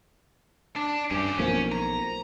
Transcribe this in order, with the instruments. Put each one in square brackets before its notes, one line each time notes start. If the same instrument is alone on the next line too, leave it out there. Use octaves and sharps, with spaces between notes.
[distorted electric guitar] D4
[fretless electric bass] G2 [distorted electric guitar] C#4 G4
[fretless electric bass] B1 F3 A#3 [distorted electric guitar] C#4
[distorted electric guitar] A#5